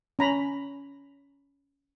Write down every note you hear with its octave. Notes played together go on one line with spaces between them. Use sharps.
C#4 A#5 B5